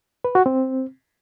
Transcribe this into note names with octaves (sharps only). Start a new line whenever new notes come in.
B4
F#4
C4